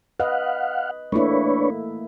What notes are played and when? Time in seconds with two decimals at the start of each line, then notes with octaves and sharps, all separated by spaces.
0.20 B4 D#5 F5 F#5
1.12 A3 A#3 D4 E4 B4 C#5